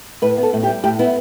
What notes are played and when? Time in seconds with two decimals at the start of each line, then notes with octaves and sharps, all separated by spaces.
0.22 A2 B4
0.38 B3
0.43 A4
0.53 A2
0.63 G4
0.68 G3
0.84 A2 G4
0.99 B3 E4